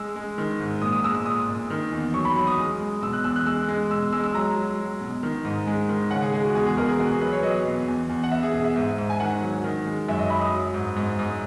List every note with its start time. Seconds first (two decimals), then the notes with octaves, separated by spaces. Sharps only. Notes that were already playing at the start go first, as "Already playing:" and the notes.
Already playing: G#3 E6
0.16 G#3
0.38 D#3
0.60 G#2
0.82 A#2 D#6
0.92 D#6
1.04 G#3 E6
1.15 E6
1.25 A#2 D#6
1.48 A#2
1.70 D#3
1.92 E2
2.14 F#3 C#6
2.25 B5
2.36 F#3 B5
2.47 D#6
2.58 G#3
2.81 G#3
3.02 B2 E6
3.13 F#6
3.24 E2 E6
3.36 F#6
3.46 G#3 E6
3.68 G#3
3.91 B2 E6
4.12 G#3 E6
4.24 E6
4.34 F#3 A#5
4.56 F#3
4.79 F#3
5.01 B2
5.23 D#3
5.45 G#2
5.67 G#3
5.89 D#3
6.11 C#3 F#5
6.22 G#4
6.33 G#3 G#4
6.44 F#4
6.55 E2 G#4
6.66 G#4
6.77 E2 A#4
6.89 G#4
6.99 B2 F#4
7.11 G#4
7.21 F#3 B4
7.33 C#5
7.43 F#3 D#5
7.66 B2
7.88 E2
8.09 E2
8.24 F#5
8.31 E2 E5
8.43 G#4
8.53 B2 G#4
8.64 E5
8.76 G#2
8.98 G#2
9.10 G#5
9.20 D#3 F#5
9.42 F#3
9.64 D#3
9.86 G#3
10.08 F#2 E5
10.19 D#5
10.30 F#2 B5
10.41 D#6
10.52 F#3
10.74 G#2
10.96 G#2
11.19 G#2